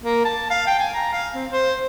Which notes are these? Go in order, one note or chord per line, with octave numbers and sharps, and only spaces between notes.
A#3
A5
F5
G5
G#5
A#5
F5
C4
C5